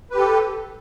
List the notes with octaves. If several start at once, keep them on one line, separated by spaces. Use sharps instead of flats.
G4 A4 B4